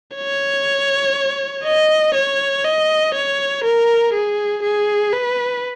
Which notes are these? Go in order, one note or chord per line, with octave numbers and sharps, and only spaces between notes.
C#5
D#5
C#5
D#5
C#5
A#4
G#4
G#4
B4